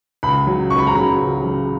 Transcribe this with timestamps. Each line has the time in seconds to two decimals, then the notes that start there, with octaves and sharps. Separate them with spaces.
0.23 C#2 B5
0.47 C#3 F#3
0.70 C#2 C#6
0.79 B5
0.87 A#5
0.95 C#3 F#3 B5
1.18 C#2
1.43 C#3 F#3